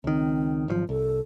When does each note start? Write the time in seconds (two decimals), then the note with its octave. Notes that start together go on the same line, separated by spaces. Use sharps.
0.04 C#2 D#3 C4
0.68 G#1 D#3 F3 F#3
0.89 C2 A4